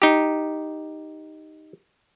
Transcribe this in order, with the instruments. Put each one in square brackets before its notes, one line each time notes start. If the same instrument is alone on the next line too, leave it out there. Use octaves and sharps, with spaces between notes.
[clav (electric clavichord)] D#4 G4